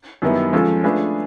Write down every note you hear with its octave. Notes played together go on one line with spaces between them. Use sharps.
F#2 D#3 G3 B3 E4
F3 G#3 C#4 F4 A4
A3 D4 F4 G#4 B4